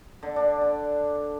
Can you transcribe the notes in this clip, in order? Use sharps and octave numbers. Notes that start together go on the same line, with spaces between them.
D3
D4
D3